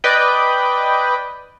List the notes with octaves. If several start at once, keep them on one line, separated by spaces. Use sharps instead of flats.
B4 D5 D#5 G5